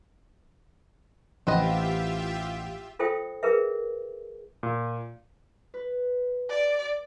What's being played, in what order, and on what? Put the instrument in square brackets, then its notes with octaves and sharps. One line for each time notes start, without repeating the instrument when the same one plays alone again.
[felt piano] A1 F#5 [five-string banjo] C4 B4 D#5 [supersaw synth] F4 G4 E5
[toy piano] F4 A4 C5 E5 G5 D#6
G#4 A#4 B4 E5
[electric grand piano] A#2
[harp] B4
[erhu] D5